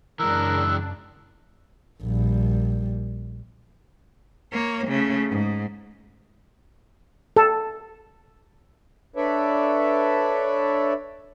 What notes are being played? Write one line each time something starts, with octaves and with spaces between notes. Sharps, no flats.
F#2 C#3 E3 G#3 D4 A#4 E6 F#6
A#1 G3
A#3 C#5
C#3 A3
G#2
A4
D4 A4 B4 C#5 D5 E5